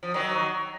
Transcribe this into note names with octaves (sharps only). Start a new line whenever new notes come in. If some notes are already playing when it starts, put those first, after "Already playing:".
F3
D#3 F#3